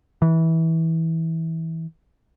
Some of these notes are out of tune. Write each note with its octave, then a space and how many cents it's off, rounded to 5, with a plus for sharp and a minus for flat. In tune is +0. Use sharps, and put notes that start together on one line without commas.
E3 -20